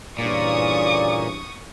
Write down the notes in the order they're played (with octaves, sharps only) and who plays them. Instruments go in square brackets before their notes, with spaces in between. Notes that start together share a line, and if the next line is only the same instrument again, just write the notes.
[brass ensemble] G2 C#3 E3 [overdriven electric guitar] A#2 [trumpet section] D5 [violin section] C#6 D#6